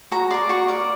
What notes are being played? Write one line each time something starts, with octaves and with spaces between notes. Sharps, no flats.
F#4 A#5
A#4 D5 C6
F#4 C#6
A#4 D5